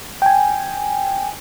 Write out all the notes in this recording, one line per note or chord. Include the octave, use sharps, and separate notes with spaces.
G5 G#5